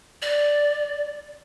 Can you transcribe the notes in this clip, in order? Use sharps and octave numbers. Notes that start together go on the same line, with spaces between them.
D5